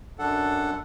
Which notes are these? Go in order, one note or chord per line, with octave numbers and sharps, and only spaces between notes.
F#2 D4 A4 F#5